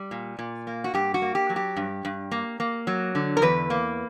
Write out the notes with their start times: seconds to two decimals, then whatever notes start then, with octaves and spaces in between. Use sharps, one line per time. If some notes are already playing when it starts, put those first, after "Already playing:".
Already playing: G3
0.11 A#2
0.39 A#2
0.67 A#3
0.84 F#4
0.94 G2 G4
1.14 F#4
1.22 A#3
1.35 G4
1.50 F#3
1.56 G4
1.76 G2
2.05 G2
2.31 A#3
2.60 A#3
2.87 F#3
3.15 D3
3.37 A#4
3.42 E2 B4
3.70 A#3